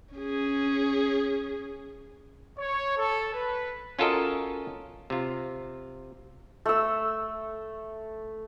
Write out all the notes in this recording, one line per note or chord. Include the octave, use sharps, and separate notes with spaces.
C#4 G#4
C#5
A4
B4
C#4 F4 F#4 A4 A#4 D#5
C3 F4
A3 E6